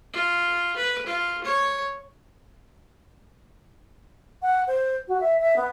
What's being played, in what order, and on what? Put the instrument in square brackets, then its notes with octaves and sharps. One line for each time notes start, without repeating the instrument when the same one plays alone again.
[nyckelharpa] F4
B4
F4
C#5
[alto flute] F#5
C5
F#4
E5
E5
B3